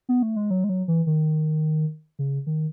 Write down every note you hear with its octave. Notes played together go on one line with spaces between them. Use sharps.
B3
A3
G#3
F#3
G#3
F#3
E3
D#3
C#3
D#3